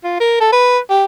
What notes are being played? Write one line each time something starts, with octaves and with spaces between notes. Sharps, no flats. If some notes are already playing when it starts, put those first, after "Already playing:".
F4
A#4
A4
B4
G4